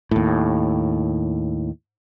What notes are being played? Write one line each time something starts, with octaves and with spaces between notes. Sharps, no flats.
D#2 A2